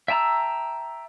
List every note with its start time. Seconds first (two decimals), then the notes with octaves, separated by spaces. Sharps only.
0.08 E5 G5 A5 A#5 E6